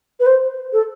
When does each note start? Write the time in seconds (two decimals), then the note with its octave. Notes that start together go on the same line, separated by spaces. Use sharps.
0.20 B4
0.26 C5
0.73 A4